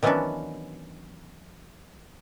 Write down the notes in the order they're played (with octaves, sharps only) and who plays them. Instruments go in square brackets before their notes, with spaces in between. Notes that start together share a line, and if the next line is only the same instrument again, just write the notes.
[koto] D#3 E3 F#3 B3 C#4 D4